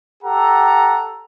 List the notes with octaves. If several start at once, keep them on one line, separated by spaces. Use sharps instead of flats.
G4 A4 F#5 A#5